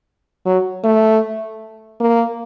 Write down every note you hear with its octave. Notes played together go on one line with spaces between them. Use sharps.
F#3
A3
A#3